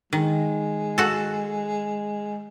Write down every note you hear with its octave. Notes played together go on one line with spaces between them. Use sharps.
D#3 G#3
F#4 A4